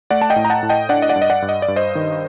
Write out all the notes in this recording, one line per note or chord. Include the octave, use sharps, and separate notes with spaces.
A3 D5 F#5
A5
D#5 G5
A2
A#5
F#5 A5
A2
D#5 G5
D4 D5 F#5
D#5
D5 F#5
G2
D#5
D5 F#5
G2
D#5
D5
G2
C5 D#5
D#3